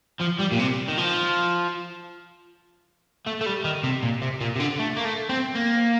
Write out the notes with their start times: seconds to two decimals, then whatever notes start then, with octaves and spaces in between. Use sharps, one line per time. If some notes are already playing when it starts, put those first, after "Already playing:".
0.21 F3
0.40 G3
0.52 A#2
0.59 C3
0.88 D#3
0.98 F3
3.26 A3
3.41 A3
3.46 G3
3.64 D#3
3.84 C3
4.03 A#2
4.22 C3
4.41 A#2
4.56 C3
4.60 D3
4.79 A3
4.96 A#3
5.05 A3
5.29 C4
5.55 A#3